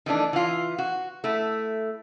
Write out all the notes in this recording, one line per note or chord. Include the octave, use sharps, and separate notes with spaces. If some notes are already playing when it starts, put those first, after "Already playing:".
D#3 E3 A3 D4
E3 F4
F#4
A3 E4